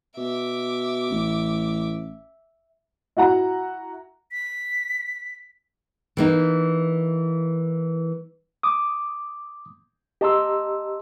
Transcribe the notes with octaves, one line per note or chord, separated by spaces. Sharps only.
B2 E5 D6
A1
E4 F#4 F#5 A#5
B6
E3 A#3 D#4
D6 D#6
G4 D#5 A5 A#5 C6 E6